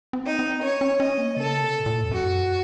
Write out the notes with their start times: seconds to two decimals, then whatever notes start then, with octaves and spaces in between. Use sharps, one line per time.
0.13 C4
0.26 D#4
0.39 C4
0.62 C#4 C#5
0.81 C#4
1.00 C#4 D#5
1.18 A#3
1.37 C#3 A4
1.62 C3
1.79 A2
1.86 A#2
2.03 F2
2.11 F#2 F#4